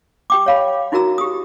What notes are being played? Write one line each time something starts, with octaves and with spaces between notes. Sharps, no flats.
G4 G5 D6
C#5 F5 B5
D#4 E4 F#4 A#4 A#5 E6
G4 D#6